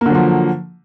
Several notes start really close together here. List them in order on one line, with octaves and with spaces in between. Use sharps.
A#3 D3 F#3 F3